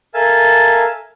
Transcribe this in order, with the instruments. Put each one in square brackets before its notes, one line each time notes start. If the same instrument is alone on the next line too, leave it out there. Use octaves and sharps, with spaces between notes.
[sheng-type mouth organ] A4 A#4 E5 F5 G#5 A5